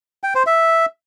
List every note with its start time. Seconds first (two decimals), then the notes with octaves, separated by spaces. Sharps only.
0.23 G5
0.35 C5
0.46 E5